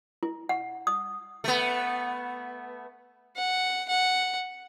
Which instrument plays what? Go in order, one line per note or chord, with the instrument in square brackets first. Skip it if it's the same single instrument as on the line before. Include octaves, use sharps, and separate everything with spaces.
[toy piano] E4
F#5
D#6
[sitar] A3 B3
[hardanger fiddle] F#5
F#5